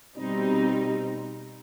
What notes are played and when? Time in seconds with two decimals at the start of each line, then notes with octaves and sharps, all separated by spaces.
0.16 B2 G3 C4 D#4